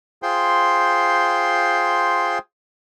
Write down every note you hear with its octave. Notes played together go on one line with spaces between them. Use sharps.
F4 G#4 C5 G5 C6